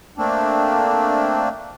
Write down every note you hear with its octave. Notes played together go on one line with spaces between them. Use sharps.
A3 A#3 C4 D4